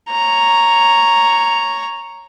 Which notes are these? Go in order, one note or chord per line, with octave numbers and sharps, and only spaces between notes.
C#5 A#5